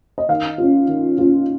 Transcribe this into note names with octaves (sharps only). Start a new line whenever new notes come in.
D#5
D#3 F5
C#4 F4
D#3
C#4 F4